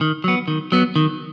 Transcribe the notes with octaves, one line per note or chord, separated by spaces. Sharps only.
D#3
F#3 B3
D#3
F#3 B3
D#3